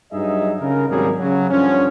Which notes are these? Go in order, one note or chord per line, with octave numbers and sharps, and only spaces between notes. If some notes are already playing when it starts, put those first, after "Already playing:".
G2 F#3 D#4 G#4 D#5 E5
C#3 A#4
G#1 D#2 F#3 G3 G#4 A#4
C#3 F#3
G2 D3 F3 C#4